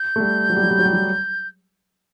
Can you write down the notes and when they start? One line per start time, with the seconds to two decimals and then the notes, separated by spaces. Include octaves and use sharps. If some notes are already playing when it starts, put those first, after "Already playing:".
Already playing: G6
0.16 A3
0.20 G3
0.49 F#3
0.57 G3
0.63 F#3
0.71 G3
0.79 F#3
0.85 G3
0.93 F#3